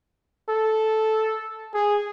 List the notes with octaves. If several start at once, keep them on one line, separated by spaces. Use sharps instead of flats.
A4
G#4